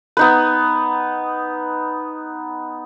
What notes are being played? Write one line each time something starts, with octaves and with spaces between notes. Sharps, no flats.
B3 D#4 B4